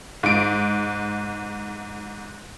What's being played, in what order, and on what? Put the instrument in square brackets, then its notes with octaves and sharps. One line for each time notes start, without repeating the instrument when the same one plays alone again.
[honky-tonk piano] G#2 D7